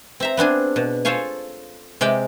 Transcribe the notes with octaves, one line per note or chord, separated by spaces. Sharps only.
C4 E5 A#5
B3 C4 D4 G#4
B2
F4 A4 C5 C#5 F5 G#5
C3 G#3 D5 G5